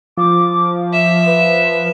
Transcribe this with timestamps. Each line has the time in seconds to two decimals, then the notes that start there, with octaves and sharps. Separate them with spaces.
0.17 F3 D6
0.93 E5 E7
1.27 B4